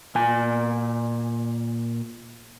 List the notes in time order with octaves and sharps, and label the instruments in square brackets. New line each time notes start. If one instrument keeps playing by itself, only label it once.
[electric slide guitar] A#2 G#5